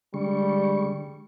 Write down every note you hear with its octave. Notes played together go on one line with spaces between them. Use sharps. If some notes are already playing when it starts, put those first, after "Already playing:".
D3 G3 G#3 C#6